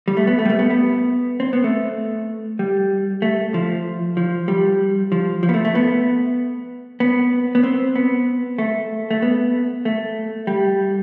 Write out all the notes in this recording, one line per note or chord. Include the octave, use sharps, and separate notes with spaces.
G3
A3
B3
A3
G3
A3
B3
B3
C4
B3
A3
G3
A3
F3
F3
G3
F3
F3
B3
A3
A3
B3
B3
B3
C4
B3
A3
A3
B3
A3
G3